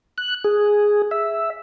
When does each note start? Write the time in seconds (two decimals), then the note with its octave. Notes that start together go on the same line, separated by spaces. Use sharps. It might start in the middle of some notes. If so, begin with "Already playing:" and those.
0.18 F#6
0.44 G#4
1.11 E5